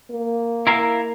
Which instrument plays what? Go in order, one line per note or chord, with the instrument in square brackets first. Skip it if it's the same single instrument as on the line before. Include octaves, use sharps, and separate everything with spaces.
[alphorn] A#3
[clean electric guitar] E4 A#4 F5